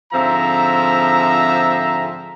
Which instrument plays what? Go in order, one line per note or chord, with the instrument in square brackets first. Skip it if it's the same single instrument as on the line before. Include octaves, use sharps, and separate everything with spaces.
[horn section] G#2 D3 F3 C4 E5 A#5